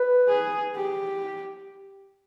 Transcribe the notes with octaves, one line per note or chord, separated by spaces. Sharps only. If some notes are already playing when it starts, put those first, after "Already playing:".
Already playing: B4
G#4
G4